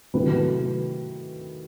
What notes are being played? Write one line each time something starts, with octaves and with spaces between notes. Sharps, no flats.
C3 D#3 F#3 A3 E4 B4